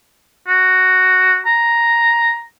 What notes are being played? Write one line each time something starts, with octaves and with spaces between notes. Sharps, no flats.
F#4
A#5